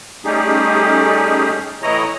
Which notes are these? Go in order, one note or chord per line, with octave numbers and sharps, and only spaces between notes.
G3 A3 C#4 D#4 G4 G#4
A2 E3 E4 C#5 D#5 A#5